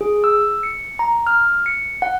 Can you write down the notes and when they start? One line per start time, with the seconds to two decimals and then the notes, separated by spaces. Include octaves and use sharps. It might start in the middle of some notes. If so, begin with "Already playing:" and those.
0.01 G#4
0.24 E6
0.63 C#7
0.99 A#5
1.27 F6
1.66 C#7
2.02 F#5